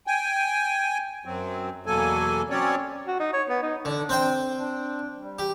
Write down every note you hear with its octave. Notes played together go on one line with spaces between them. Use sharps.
G5 G#5
F#2 F#3 C4
E2 B2 F#3 A#3 A4 G#5
F#3 C4 C#4 C#5 D5
F#4
D#4
C#5
B3
D#4
D3 D4
C4 C5 G5
D4
G3
G4